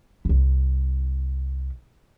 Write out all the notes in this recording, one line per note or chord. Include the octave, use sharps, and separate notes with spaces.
C2 E4